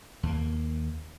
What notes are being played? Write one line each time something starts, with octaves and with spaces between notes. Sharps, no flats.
D#2 A#3